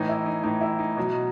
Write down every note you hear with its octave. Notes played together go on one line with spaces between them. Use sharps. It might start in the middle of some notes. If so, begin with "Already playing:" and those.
Already playing: A2 E3 D#4
E4
D#4
A2 E3 D#4
E4
D#4
B2 F#3